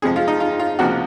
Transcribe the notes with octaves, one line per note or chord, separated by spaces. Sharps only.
F2 C3 F3 G#3 G#4
F4
D#4
F4
F4
C#2 C3 F3 A#3 F#4